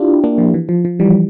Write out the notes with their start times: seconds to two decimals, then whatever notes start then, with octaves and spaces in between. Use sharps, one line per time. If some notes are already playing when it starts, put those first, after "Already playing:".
Already playing: D4 E4 F4 G4
0.24 A#3 D4
0.38 F3
0.54 E3
0.69 F3
0.85 F3
0.99 E3 G3